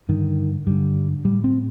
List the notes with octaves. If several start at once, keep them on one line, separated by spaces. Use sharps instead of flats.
G2 D3 D#3
G2 D3 G3
A2 G3
C4